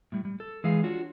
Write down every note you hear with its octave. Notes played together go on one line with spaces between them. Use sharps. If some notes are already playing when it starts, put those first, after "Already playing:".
A2 G3
G3
A4
E3 G#3 G#4 F5
D4 F4 F#4 C#5